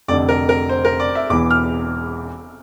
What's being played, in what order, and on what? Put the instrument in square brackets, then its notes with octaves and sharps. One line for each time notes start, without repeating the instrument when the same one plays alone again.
[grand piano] F1 F2 D3 [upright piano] D5
[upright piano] A#4
A#4
C5
A#4
D5
E5
[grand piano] E1 E2 E3 [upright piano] D6
[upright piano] F6